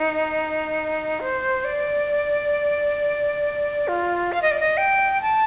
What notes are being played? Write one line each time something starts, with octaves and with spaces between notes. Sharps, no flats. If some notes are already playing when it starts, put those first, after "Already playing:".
Already playing: D#4
C5
D5
F4
F5
D#5
D5
D#5
G5
A5